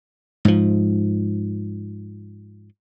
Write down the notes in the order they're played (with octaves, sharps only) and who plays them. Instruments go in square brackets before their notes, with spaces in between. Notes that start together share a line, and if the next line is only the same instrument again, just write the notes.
[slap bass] G#2 F3